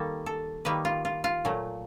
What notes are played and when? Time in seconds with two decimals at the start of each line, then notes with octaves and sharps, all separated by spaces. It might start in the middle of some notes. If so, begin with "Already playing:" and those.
Already playing: D#3 G3 A#3 A4
0.26 A4
0.65 D#3 G3 A#3 B4
0.85 F4
1.05 F4
1.24 F4
1.45 A#2 F#3 A3